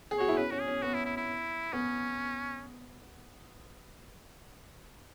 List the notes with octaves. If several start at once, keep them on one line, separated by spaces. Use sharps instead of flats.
G#4
F#4 C#5
E4
C#4 B4
C#4 F#4
G#4
C#4
B3 F#4
E4
E4
E4
B3 C#4